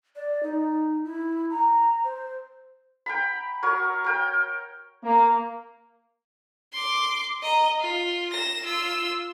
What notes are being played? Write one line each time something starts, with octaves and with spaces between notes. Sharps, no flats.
D5
D#4
E4
A#5
C5
G5 A#5 B5
F#3 A#4 C#5
A#4 G5
A#3
C6 D6
D#5 A#5
F4
A#6 E7
F4 E6